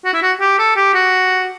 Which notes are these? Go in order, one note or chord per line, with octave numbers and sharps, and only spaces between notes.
F#4
E4
F#4
G4
A4
G4
F#4